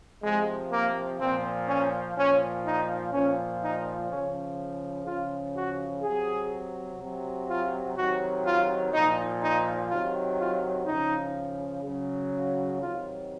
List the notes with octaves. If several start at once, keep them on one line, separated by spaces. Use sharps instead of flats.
C3 F3 G#3
A#3
A#2 F3 C4
C#4
A#2 F3 C#4
D#4
A#2 F3 C#4
D#4
C#3 F3 C#4
C#3 F3 F4
F#4
C3 F#3 G#4
C3 F#3
F4
C3 D#3 F#3 F#4
F4
A#2 F3 D#4
D#4
C3 D#3 F#3 F4
F4
C#3 F3 D#4
C#3 F#3
C3 D#3 F#3 F4